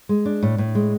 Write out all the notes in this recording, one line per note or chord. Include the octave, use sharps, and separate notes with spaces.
G#3
D4
A2
A2
G#3